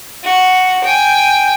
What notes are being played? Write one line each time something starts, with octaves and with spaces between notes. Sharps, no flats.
F#4
G5 G#5